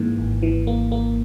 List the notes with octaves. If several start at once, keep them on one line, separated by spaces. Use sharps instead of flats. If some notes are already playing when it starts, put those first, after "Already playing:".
Already playing: G#2 E3 A#3
G#1
E3
A#3
A#3